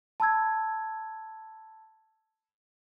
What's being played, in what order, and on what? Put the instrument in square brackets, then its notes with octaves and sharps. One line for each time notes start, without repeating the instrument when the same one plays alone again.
[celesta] A5 B5 E6 G#6